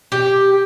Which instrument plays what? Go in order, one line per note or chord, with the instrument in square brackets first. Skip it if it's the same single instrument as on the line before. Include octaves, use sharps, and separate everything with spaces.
[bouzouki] G4